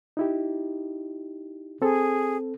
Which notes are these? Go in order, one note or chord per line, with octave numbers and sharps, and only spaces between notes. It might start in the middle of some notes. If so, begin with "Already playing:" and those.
D#4 E4 G4
C4 G#4 A4